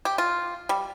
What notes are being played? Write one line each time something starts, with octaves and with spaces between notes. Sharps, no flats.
G4
F4
G3